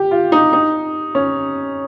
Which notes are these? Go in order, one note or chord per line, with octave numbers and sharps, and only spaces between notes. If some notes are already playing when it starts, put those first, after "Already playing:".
Already playing: G4
F4
D#4
D#4
C#4